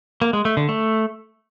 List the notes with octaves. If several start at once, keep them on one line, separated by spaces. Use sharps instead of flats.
A#3
G#3
A3
D3
A3